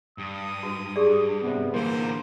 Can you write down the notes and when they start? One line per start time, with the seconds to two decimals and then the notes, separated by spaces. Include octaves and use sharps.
0.18 G2 D#6
0.63 F#4
0.96 G4 G#4 D5
1.42 C3 G3 B3
1.74 D3 E3 A#3 C5